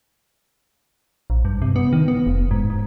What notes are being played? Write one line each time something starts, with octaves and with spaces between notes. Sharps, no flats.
A#1
G2
C3
B3
D#3
B3
F1
G#2
G#2